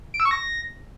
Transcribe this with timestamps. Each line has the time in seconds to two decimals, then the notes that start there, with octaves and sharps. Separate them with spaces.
0.14 D7
0.20 E6
0.25 C#6
0.31 A#6